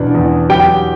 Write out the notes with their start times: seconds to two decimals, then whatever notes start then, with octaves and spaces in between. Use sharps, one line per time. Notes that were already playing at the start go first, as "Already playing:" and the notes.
Already playing: E2 B2 D4
0.14 E2
0.49 F#3 G4 G5